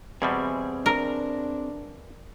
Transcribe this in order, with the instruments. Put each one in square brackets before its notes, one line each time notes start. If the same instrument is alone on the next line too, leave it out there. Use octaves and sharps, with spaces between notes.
[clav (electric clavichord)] E2 B2 G3 [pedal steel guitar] C4 G#4 G#5
[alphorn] D4 [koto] A#4